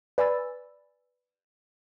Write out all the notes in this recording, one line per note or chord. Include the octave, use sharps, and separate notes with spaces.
B4 D5 G#5 B5 E6 A6